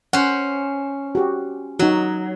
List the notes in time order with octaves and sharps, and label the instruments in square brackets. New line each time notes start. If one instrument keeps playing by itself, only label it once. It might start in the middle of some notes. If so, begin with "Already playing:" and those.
[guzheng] C#4 C5 [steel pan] F#5
[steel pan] F#4 G4
[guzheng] F#3 [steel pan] D#4 F#4